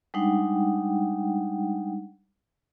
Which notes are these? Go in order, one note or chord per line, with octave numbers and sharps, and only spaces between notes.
G3 G#3 D4 D#4 F#5 G5